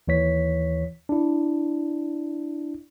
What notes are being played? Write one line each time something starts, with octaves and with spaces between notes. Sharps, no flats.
D#2 E3 C#5 B6
D4 E4